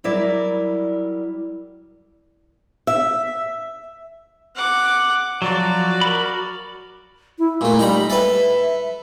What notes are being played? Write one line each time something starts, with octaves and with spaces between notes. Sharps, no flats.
F#3 G3 E4 A#4 D5
E5
F#5 D6
F3 F#3 F#4 D5
A#4 B5
E4
A#2 A3 A#3
G3 D#4 A#5 B5
A4 B4 E5